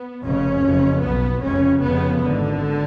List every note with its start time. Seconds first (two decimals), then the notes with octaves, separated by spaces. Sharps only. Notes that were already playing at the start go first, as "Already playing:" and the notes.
Already playing: B3
0.23 F1 F2 C#3 C#4
0.63 F#1 F2 C#3
1.02 B1 B2 B3
1.42 F1 F2 C#3 C#4
1.82 F1 F2 C#3 B3
2.21 G#1 G#2 D3